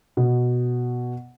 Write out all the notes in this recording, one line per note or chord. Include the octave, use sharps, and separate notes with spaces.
B2